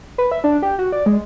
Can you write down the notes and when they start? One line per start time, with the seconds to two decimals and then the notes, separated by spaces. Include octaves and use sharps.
0.18 B4
0.32 E5
0.44 D4
0.62 G4
0.79 F#4
0.92 D5
1.06 G#3